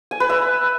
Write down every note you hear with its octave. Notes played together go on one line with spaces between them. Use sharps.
G#5
B4
E5